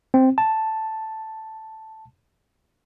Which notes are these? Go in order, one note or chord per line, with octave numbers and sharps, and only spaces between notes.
C4
A5